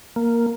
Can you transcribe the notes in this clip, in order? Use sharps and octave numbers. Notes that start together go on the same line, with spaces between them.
A#3